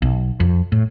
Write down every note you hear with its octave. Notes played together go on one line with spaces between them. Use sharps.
B1
F2
A2